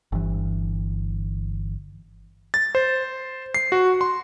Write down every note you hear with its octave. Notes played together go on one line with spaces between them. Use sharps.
G1 E3
A6
C5
C7
F#4
C6